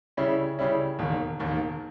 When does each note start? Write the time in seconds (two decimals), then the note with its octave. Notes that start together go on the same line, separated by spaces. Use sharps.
0.17 C#3 G3 C#4 E4
0.59 C#3 G3 C#4 E4
0.99 E1 D#2 D#3
1.39 E1 D#2 D#3